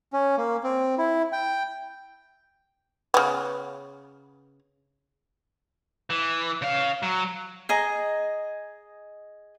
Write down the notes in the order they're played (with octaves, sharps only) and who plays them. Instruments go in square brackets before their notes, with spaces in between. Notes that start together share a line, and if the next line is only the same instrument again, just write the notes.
[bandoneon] C#4
A#3
C4
E4
G5
[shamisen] C#3 B3
[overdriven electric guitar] E3
C#3 F5
F#3
[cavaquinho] G#4 D#5 A#5